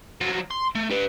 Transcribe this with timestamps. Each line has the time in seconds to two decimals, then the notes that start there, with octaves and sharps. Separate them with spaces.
0.21 F3 F#3
0.51 C6
0.75 A3
0.91 G4 B4